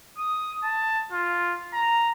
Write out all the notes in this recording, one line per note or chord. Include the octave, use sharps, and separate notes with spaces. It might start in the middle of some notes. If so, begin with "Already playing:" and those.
D#6
A5
F4
A#5